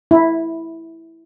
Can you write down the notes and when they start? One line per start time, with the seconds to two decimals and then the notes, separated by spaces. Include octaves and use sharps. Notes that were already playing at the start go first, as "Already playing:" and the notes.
0.11 E4